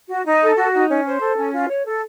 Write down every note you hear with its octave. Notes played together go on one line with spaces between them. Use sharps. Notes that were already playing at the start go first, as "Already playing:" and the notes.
F#4
D#4
A4
F#4
D#4
C#4
C5
A4
C#4
F4
C#5
A4